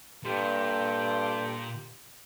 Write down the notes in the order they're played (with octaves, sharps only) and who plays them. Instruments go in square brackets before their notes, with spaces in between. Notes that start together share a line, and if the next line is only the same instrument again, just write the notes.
[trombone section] G2 A4 [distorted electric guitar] A#2 [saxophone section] F4 G4